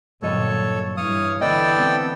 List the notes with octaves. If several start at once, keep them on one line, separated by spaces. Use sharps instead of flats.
G2 A#2 D3 F#3 A4 C#5 D#5
G2 E3 C#5 F5 D#6
D3 E3 A3 B3 A4 D5 D#5 G5
C4